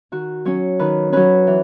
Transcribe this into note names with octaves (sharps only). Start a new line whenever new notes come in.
D#3 F#4
F#3 C#4 C#5
D#3 B4
F#3 C#4 B4
E3